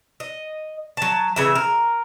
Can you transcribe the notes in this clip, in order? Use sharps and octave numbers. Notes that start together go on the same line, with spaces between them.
D#5
F#3 A5
C#3 E3 E5
A#4